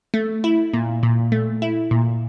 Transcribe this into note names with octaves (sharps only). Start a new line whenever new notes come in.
A3
E4
A#2
A#2
A3
E4
A#2